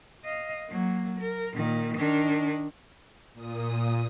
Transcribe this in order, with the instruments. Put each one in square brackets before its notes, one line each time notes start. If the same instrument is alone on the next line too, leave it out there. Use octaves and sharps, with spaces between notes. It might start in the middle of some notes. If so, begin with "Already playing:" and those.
[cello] D#5 F5
F#3 A#3
A#4
A#2 D#3
D#3 D4
[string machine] A#2 D#6